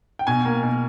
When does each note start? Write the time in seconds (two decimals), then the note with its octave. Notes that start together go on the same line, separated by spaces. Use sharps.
0.19 G5
0.27 B2 G#5
0.45 A#3
0.63 B2